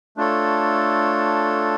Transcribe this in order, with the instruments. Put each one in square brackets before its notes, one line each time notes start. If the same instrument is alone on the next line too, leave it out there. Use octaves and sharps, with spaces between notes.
[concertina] A3 D4 F4 A4 C#5